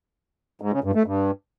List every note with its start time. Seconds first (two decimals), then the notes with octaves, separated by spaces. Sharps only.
0.61 G#2
0.73 C#3
0.84 G2
0.95 A3
1.06 G2